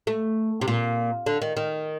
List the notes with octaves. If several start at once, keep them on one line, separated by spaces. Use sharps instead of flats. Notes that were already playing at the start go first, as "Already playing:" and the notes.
A3
C3
A#2
D3
D#3
D#3